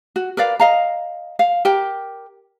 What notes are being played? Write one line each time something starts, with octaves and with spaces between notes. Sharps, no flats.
F#4
A#4 B4 D5 F5
D#5 F5 A#5
F5
G4 A#4 G5